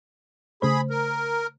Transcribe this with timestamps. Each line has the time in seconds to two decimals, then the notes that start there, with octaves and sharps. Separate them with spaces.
0.62 C#3 A3 G#4 C5 B5
0.90 A#4